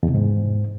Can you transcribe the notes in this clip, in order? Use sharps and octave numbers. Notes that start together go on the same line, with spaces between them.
E2
C3
G#2